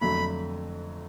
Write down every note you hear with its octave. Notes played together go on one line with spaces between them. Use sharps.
F2 D3 F#3 A3 B5